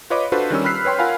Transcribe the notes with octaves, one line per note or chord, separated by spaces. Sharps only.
F4 B4 C#5 D#5 B5 D6
D4 F4 F#4 A4 B4 C5
D#3 G3 C#4 E6
B5 F6 F#6 B6 C7
B4 C#5 G5 C6
F4 A#4 F5 F#5 G#5 B5